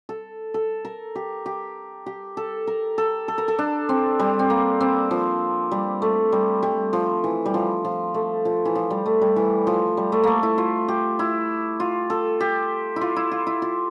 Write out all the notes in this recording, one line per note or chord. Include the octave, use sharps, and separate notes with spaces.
A4
A4
A#4
G4
G4
G4
A4
A#4
A4
A4
A#4
A4
D4
C4
G3
C4
A#3
C4
F3
G3
A3
G3
G3
F3
E3
G3
F3
F3
A3
F3
E3
F3
G3
A3
G3
E3
F3
G3
A3
A3 A#3
E4
F4
G4
E4
F4
A4
G4
E4
F4
E4
F4
E4
F4